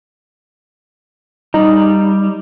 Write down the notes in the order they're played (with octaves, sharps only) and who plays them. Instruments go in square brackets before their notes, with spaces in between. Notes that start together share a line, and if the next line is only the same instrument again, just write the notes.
[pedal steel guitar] G3 [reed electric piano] D#4